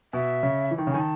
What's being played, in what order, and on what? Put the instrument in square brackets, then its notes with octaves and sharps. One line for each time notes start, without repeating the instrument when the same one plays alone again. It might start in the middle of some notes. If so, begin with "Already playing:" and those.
[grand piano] B2 [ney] E5
[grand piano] C#3
E3
D#3
C#3
[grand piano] D#3 [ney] G#5
[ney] A5